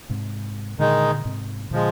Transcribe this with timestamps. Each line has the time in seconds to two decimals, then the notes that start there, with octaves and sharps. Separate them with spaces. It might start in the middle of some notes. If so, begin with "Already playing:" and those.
0.10 G#2 C3
0.79 A#2 D3 D#3 G#3 D#4
1.25 G#2 C3
1.71 A#2 D3 F3 G#3